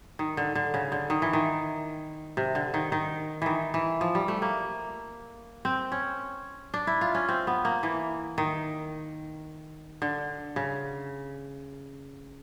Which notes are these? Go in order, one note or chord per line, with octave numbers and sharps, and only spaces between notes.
D#3
D3
D3
C#3
D3
D#3
E3
D#3
C3
D3
D#3
D#3
D#3 E3
E3
F3
G3
A3
A#3
C4
C#4
D4
E4
F4
C#4
C4
B3
A#3
E3
D#3
D3
C#3